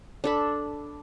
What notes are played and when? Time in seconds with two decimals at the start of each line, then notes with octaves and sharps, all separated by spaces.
0.24 D4 A4 B5